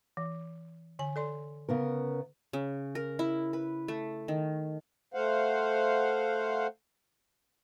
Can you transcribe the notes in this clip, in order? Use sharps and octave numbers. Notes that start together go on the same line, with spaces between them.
E3
D3 G#5
A4 D5 C6
C#3 B3 A#4
C#3
A#4
E4
B4
A3
D#3
A3 C5 F5 F#5